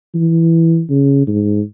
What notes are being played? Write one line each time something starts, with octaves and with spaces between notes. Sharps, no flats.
E3
C#3
G#2